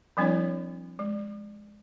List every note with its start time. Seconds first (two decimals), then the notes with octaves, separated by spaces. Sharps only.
0.17 F3 G3 C4 D4 E4 C#5
0.99 G#3